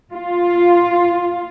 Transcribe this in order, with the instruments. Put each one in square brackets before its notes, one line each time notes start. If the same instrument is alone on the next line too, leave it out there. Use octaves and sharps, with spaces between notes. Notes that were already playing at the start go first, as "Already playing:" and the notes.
[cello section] F4